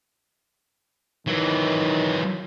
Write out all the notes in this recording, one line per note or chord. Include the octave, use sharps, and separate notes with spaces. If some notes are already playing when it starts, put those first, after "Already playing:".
D#3 E3 F#3